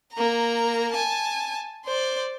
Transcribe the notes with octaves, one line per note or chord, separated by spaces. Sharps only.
A#3 A#5
G#5 A5
C5 D5